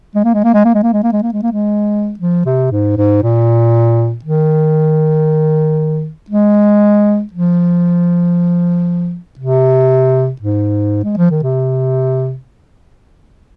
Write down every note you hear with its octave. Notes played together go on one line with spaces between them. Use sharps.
G#3
A#3
G#3
A#3
G#3
A#3
G#3
A#3
G#3
A#3
G#3
A#3
G#3
A#3
G#3
F3
C3
G#2
G#2
A#2
D#3
G#3
F3
C3
G#2
G#3
F3
D#3
C3